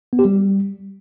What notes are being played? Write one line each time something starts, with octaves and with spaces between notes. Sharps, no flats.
B3
G4
G3